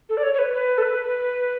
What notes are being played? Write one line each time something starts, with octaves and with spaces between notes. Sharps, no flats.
A4
D5
C#5
C#5
B4
B4
A4
B4